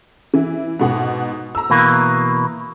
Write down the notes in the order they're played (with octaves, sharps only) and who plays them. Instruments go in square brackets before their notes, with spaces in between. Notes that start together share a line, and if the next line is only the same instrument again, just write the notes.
[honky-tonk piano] E3 E4
G#2 B2 F#5
A#5 E6
[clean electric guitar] B2 E3 A#3